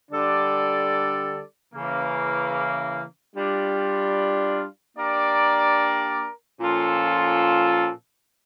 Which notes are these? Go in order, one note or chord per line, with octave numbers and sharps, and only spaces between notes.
D3 G3 D4 A4 D5
C#3 E3 A#3
G3 D4 F4
A#3 D4 G4 A#4 D5
A#2 F3 C#4 F4 A4